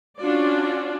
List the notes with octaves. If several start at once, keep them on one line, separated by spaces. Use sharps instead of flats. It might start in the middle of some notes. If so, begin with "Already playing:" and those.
C#4 D4 F4 F#4 D5